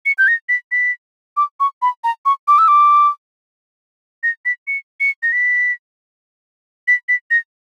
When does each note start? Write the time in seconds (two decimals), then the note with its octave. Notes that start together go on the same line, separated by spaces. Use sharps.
0.06 C#7
0.18 G6
0.28 A#6
0.49 B6
0.72 B6
1.37 D6
1.60 C#6
1.82 B5
2.04 A#5
2.26 C#6
2.48 D6
2.58 E6
2.68 D6
4.23 A#6
4.45 B6
4.67 C#7
5.00 C#7
5.23 A#6
5.33 B6
6.88 B6
7.09 B6
7.31 A#6